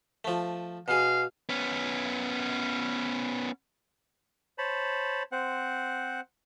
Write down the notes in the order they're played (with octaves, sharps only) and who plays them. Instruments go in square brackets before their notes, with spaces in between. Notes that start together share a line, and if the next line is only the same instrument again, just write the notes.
[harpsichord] F3 A3
[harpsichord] B2 G#4 [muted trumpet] F5
[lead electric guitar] B3 C#4
[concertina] C5 C#5 A5 B5
C4 C5 F#5